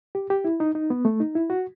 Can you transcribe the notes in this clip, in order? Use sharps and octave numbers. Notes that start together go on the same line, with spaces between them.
G4
G4
E4
D#4
D#4
B3
A3
D#4
E4
F#4